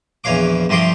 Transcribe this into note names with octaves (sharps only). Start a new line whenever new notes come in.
A#1 E2 E3 C#5 F5 D6
G2 C3 F3 A3 C6 D6